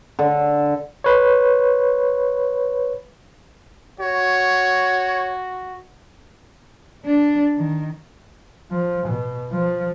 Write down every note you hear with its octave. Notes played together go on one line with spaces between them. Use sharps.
D3
B4 C#5
F#4 C#5
D4
D#3
F3
B2
F3